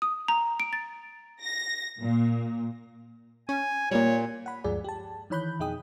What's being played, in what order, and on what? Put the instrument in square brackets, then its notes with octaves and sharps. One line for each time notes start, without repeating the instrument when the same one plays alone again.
[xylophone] D#6
A#5
D7
A6
[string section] A#6
A#2
[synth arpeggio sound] C#4 [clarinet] G#5
[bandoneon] A#2 [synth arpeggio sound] G3 A#3 [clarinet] C#5
[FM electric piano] F#5 B5
D2 G2 F3 G#3 G#4 D5
G4 A5
D#3 E3 C#5 B5 F#6 G6
F2 B2 D#4 G#4 G5 D#6